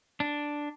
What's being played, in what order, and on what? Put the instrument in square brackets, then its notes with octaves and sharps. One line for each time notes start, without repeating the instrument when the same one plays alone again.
[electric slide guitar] D4